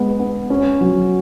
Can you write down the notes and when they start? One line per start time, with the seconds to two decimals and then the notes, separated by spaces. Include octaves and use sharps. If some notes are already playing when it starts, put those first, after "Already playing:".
Already playing: G#3 B3
0.19 B3
0.50 C#4
0.81 F#3